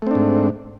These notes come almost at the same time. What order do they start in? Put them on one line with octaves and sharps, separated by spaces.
A3 C4 D4 G#2